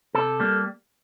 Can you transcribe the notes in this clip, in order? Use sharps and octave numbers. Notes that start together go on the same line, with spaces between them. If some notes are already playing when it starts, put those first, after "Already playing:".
C3 A4
G3 A#3